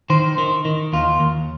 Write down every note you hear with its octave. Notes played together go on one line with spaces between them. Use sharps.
D#3 C5
D#3
D#3
D#2 F4
D#2